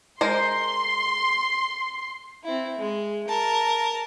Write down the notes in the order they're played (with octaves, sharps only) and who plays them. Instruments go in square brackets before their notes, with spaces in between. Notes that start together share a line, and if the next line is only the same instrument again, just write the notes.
[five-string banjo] G#3 A#4 C5 [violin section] C6
[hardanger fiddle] C4 E4
G#3
A#4 A5